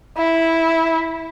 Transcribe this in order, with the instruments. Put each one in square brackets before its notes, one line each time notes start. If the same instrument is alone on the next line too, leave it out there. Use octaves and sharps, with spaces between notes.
[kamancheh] E4